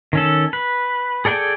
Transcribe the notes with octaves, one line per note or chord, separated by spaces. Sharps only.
D#3 C#4 A4
B4
G#4 A4 D5 G5 G#5